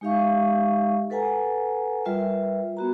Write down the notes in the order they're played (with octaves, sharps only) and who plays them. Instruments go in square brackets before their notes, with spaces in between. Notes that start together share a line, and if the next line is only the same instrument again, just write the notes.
[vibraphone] G#3 D#4 G4 E5 F5 C#6
A4 B4 F#5 G#5 A#5
G3 F4 A#4 B4 E5 G5
B3 F#4 A#5